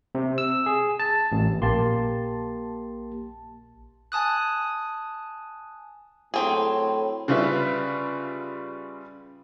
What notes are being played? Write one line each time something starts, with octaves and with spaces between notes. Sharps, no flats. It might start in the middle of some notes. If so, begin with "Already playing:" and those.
C3
E6
G#4
A5
A1
A#1 A#3 G4 A5 C6
G#5 A5 D#6 F#6
A2 F#3 C4 G#4
C#3 G3 F4 B4 E5